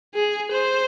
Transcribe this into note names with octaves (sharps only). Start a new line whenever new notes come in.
G#4
C5